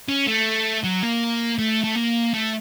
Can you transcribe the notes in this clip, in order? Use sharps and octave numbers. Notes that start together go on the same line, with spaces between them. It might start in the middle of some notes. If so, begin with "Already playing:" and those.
C#4
A3
F#3
A#3
A3
A3
A#3
A3